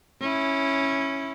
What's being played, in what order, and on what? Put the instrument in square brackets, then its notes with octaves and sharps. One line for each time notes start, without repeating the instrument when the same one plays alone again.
[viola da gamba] C#4 E4